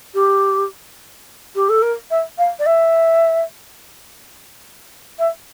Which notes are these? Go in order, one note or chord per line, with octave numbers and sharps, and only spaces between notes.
G4
G4
A4
A#4
E5
F5
D5
E5
E5